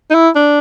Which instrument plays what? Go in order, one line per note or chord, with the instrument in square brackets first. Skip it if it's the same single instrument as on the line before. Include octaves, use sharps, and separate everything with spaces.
[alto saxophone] D#4
E4
D4